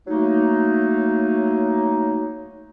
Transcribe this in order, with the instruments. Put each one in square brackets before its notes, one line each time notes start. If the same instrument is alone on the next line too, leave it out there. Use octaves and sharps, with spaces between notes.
[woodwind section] F#3 A3 A#3 D#4